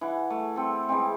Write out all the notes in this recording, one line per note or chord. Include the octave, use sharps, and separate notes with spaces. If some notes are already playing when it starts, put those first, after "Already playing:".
E3 F#5
A3
C4 A4
E3 G#3 C4